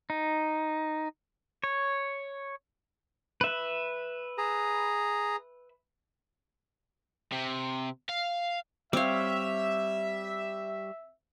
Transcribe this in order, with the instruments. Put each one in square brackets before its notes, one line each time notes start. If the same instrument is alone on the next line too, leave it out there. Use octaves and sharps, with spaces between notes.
[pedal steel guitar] D#4
C#5
B4 E5
[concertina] G#4 A#5
[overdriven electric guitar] C3
F5
[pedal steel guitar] G3 C#5 [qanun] C4 F5 [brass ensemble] E5